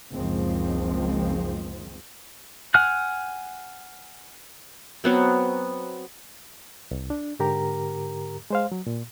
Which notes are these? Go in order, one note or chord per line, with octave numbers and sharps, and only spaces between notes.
F#1 C#2 D#3 F3 G#3 C4
F#5 G#5 F6 F#6
F#3 B3 C4
C2
D4
G#2 D3 G4 A#4 A#5
G#3 C5 F5
F#3
A#2